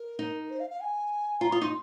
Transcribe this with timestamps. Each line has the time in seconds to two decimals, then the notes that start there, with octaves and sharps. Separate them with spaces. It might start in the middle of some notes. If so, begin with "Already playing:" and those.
Already playing: A#4
0.19 D#4
0.49 C5
0.59 F5
0.69 F5
0.80 G#5
1.41 F4 A#5
1.51 F4 D#6
1.61 D#4 C6